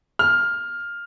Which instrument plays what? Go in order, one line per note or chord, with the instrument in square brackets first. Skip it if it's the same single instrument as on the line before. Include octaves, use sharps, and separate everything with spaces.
[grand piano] F6